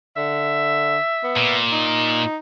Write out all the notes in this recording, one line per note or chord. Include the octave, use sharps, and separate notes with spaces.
D3 E5
B3
A#2
D#4